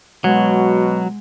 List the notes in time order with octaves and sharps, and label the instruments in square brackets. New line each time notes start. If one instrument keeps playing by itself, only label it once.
[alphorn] B2 [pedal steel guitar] F#3 [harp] G#3 F#5 G#6